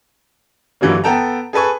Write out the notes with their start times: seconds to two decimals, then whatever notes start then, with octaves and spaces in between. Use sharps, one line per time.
0.81 G2 D3 E3 F#3 G3 A#3
1.04 B3 A4 G5 A5 A#5
1.53 G#4 A4 B4 G#5 C#6